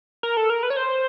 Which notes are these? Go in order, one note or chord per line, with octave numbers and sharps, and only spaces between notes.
A#4
A4
A#4
B4
C#5
C5